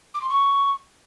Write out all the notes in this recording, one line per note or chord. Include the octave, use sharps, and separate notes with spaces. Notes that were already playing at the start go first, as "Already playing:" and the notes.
D6
C6
C#6